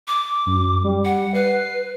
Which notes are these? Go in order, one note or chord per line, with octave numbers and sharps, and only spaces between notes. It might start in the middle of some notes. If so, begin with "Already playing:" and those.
D6
F#2
G3
F#5
B4 C7